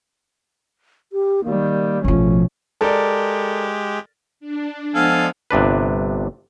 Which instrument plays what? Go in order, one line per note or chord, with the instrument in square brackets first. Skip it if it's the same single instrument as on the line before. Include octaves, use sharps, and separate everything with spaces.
[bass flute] G4
[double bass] D#3 G3 [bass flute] A#3
[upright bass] A1 F3 [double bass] B2 C#4 [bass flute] A3
[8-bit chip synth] G#3 G4 [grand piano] A4 A#4 D5
[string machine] D4
[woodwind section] F3 G#3 B3 [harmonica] A4 F5 G#5
[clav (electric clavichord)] G1 C3 D4 B4